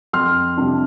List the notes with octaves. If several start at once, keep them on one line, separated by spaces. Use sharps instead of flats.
F2 C6 F6
C3 G3 D4